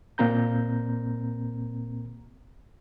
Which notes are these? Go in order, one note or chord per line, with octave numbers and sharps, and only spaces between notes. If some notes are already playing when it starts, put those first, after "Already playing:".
A#2 A#3 C4 A#5 G6